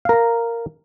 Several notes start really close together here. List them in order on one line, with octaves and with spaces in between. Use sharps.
F5 A#4 A#5